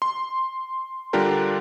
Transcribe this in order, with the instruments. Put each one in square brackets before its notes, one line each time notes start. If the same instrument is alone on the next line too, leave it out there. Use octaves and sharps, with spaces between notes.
[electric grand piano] C6
D3 G3 D4 F4 G4 A#4